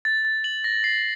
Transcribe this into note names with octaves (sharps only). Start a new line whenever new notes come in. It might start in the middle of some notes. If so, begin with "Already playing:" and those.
A6
A6
F#7
A#6
C7